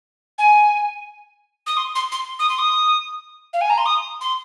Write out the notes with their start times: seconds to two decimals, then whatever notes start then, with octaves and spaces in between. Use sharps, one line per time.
0.38 G#5
1.66 D#6
1.77 C6
1.95 C6
2.12 C6
2.39 D#6
2.49 C6
2.58 D#6
3.53 F5
3.61 G#5
3.70 A#5
3.78 C6
3.86 D#6
4.21 C6